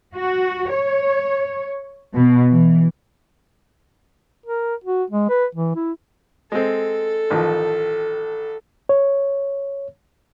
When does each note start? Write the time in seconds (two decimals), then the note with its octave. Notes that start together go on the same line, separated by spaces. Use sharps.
0.15 F#4
0.73 C#5
2.15 B2
2.50 E3
4.46 A#4
4.84 F#4
5.10 G#3
5.29 B4
5.55 E3
5.75 E4
6.52 G#3 C4 A4
7.30 A1 D#3 F3
8.89 C#5